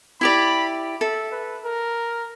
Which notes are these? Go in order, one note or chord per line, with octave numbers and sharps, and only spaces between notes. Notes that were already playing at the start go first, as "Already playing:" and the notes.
E4 G4 D5 B5
A4 E5
B4
A#4